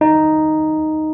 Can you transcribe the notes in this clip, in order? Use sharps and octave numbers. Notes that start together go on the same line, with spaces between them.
D#4